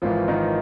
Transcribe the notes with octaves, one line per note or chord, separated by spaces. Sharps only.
G#1 G#2 E3 F3 F4
D#3 D#4